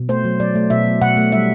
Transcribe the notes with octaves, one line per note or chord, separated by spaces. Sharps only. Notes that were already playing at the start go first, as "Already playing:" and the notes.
Already playing: B2
A3 C5
F#3
F#3 D5
A3
B2 E5
F#3
B2 F#5
A3
G3 E5